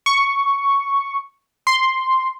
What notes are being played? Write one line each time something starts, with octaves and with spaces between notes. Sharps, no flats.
C#6
C6